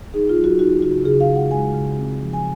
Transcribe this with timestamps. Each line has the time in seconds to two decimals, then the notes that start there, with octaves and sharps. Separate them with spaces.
0.14 D#4 G#4
0.29 F4
0.37 F#3
0.44 F#4
0.59 D#4 F#4
0.82 C#3 F#4
1.05 C#3 G#4
1.20 F5
1.28 G#3
1.36 F#5
1.51 G#3 G#5
1.74 C#3
1.97 C4
2.20 F3
2.33 G#5